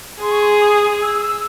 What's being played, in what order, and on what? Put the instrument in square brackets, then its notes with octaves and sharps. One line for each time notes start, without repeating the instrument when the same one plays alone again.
[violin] G#4 [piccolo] C6
[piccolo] C#6
C6
D#6
E6
E6